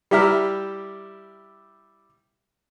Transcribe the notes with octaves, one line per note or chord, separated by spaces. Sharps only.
G3 E4 G4 E5 A#5 F6